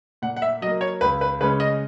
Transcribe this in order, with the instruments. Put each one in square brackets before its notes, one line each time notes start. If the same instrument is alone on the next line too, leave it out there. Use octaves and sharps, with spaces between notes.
[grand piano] A#2 F#5
F#5
E5
F#3 D#5
A#3
C#5
C#2 B4
B4
C#3 G#3 C#4 B4
D#5